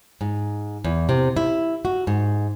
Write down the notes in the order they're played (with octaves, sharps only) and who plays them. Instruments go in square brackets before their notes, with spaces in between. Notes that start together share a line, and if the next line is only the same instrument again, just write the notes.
[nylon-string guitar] G#2
E2
C3
E4
F#4
G#2